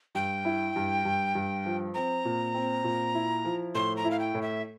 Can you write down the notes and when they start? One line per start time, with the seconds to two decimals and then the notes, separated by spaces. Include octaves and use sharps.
0.15 G2 G5
0.45 E4
0.76 G2
1.05 G2
1.35 G2
1.65 F3
1.94 C4 A#5
2.25 A#2
2.54 C4
2.84 A#2
3.14 E4
3.45 F3
3.75 A2 C6
3.97 A#5
4.04 E4
4.11 F5
4.20 G5
4.34 A2
4.42 E5